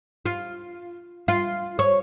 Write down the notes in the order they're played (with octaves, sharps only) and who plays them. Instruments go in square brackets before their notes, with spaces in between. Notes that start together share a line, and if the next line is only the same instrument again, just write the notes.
[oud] F4
F4
C#5